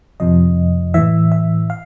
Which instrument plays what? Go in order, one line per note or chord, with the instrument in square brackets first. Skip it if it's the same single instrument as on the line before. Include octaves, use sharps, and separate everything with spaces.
[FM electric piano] F2 C3 F3 D#5
A2 E3 E5
E5
F5